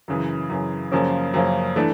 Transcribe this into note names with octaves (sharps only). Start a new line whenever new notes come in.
F#2 C#3 E3
F#2 C#3 E3
F#2 C#3 F3 A#3 C#4
F#2 C#3 F3 A#3 C#4
E3 A3 D4